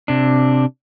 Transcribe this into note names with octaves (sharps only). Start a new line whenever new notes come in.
C3 D4